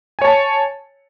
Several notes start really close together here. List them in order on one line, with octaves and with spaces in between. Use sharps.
G#5 C#5 A5